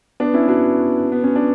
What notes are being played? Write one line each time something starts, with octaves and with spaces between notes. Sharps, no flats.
B3 D4
C#4 E4
D4 F#4
B3
C#4
D4